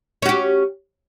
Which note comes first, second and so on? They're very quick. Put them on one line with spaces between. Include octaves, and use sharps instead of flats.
C#4 F#4 G4